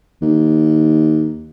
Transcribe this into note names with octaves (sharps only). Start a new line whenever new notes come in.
D#2